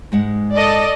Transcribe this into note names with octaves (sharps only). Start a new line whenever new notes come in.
G#2 G#3 F#5
A4 D5 D#5